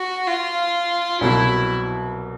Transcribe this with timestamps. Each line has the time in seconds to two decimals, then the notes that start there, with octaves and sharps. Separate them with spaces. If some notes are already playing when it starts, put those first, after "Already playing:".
Already playing: F#4
0.27 F4
1.21 C2 B2 F#3 E4